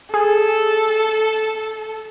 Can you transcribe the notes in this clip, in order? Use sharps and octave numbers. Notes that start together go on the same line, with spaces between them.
G#4 A4